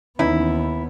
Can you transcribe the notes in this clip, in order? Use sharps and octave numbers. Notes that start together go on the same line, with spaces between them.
D#2 E3 B3 C#4 D#4 E4